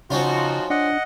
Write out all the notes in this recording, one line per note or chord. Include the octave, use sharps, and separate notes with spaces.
C#3 F3 C4 C#4 D#4 F4 F#4
D4 D#5 F#5